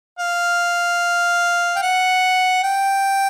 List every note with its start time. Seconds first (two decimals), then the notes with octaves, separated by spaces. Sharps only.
0.20 F5
1.76 G5
1.82 F#5
2.63 G5